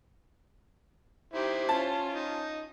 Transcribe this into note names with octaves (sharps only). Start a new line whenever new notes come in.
D#4 E4 G4 C5
C#4 F4 A5
D#4